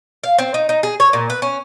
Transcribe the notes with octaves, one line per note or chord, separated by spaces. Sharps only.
F5
C4
D#4
D#4
G#4
C#5
A#2
B4
C#4